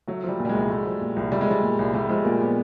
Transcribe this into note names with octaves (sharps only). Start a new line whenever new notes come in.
F#3 A3
F3
G3
A#2
G3
G#3
C2
A3
F3
A#2
C2
G3 A3
G#3
F3 G3
A#2
C2
G3 A3
F3 G#3
A#2 A#3
B3